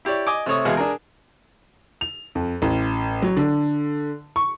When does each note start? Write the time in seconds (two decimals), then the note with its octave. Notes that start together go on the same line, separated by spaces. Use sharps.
0.05 E4 G4 C#5 D5
0.27 D#5 G#5 D6
0.46 C3 A3 C#5 D#6
0.65 E2 B2 G#3 G#4 F5
0.77 D4 G#4 A#4
2.01 F7
2.35 F2
2.62 A1
3.22 F#3
3.37 D3
4.36 C#6